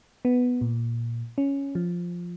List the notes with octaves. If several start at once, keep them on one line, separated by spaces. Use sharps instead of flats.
B3
A#2
C#4
F3